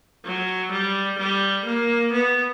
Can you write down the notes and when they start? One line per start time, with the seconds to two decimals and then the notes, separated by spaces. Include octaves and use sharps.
0.25 F#3
0.71 G3
1.19 G3
1.66 A#3
2.12 B3